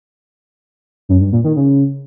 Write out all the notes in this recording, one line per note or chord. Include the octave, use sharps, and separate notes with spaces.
F#2
G2
A#2
D#3
C#3